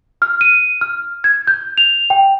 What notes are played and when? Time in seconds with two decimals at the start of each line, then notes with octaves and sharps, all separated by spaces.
0.22 F6
0.41 D#7
0.81 F6
1.24 G#6
1.47 G6
1.78 F7
2.10 G5